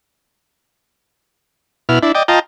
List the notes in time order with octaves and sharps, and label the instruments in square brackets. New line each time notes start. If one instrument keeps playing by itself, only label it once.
[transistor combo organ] B2 E4 F6
D4 E4
D5 D#5 G5
F4 D#5 G5 A5 A#5